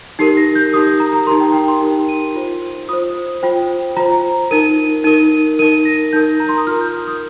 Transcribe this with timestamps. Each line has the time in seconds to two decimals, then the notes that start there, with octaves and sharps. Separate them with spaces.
0.19 D#4 G4 A#4 C7
0.37 A#6
0.55 G6
0.73 D#4 G4 A#4 D#6
0.86 D#6
1.00 A#5
1.13 A#5
1.27 D#4 G4 A#4 C6
1.40 G5
1.54 G5
1.68 C6
1.81 D#4 G4 A#4
2.09 D#7
2.35 F4 C5
2.89 F4 C5 D#6
3.42 F4 C5 G5
3.97 F4 C5 A#5
4.51 D#4 A#4 D#7
5.04 D#4 A#4 D#7
5.59 D#4 A#4 D#7
5.85 A#6
6.13 D#4 A#4 G6
6.40 A#5
6.49 C6
6.58 D#6
6.67 F4 A#4 F6
6.81 G6
6.94 F6
7.07 D#6